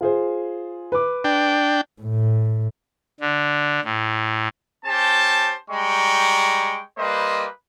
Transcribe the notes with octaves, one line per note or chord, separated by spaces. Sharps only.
F4 G#4 C5
B4 D6
D4 G5
A2
D3
A2
C#4 G4 C5 A5
G3 G#3 G5 A#5 C#6
G3 A#3 B4 C5 D#5